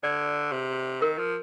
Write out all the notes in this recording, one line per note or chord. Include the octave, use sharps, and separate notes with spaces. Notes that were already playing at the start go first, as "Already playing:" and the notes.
D3 D5
C3
D#3 A#4
F3